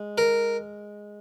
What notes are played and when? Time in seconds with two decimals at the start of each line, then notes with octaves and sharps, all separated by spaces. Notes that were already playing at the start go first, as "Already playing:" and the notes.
Already playing: G#3
0.18 A#4